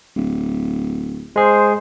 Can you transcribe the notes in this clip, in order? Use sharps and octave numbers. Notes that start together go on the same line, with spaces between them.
D1
G#3 G#4 C5